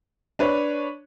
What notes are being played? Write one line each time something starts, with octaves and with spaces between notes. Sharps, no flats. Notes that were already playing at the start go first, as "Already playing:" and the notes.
D4 B4 C#5